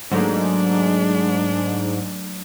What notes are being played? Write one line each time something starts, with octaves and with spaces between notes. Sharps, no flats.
G#2 F#3 A3 A#3 D4